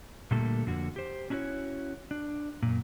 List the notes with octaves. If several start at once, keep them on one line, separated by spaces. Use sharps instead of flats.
A#2 D3 G3 A3 A#3 A4
F2 D3 A#3 F#4
G4 C5
C#4 D4 E4 F#4 C#5
D4
F#2 A#2